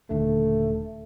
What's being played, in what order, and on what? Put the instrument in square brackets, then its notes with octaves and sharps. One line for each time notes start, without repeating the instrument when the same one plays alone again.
[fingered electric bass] D#1 D#2 D3 [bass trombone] A3